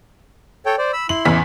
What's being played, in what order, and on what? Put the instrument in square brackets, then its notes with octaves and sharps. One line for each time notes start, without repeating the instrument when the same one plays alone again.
[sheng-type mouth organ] A4 C#5 G5
C5 D5
B5 E6
[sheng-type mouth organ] E4 C6 [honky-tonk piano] F#7
[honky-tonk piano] A1 E2 B6